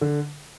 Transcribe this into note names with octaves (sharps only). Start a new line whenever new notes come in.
D3